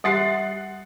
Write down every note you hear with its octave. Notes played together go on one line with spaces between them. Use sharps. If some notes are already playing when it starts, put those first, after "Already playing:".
G3 G4 F#5 C6 A6 C7